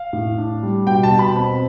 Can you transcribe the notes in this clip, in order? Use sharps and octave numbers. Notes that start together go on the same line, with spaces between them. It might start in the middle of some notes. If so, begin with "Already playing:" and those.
Already playing: F5
A2
D4
G3
B2 G5
A5
B2
B5
C4